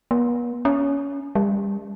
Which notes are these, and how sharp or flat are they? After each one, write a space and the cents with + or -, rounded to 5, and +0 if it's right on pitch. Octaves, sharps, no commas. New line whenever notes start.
B3 -45
C#4 +20
G3 +35